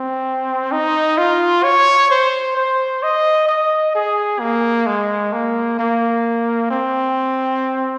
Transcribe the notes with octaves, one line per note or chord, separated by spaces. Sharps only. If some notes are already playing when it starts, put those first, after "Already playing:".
Already playing: C4
D#4
F4
C#5
C5
C5
D#5
D#5
G#4
A#3
G#3
A#3
A#3
C4